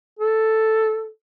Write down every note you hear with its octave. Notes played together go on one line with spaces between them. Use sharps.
A4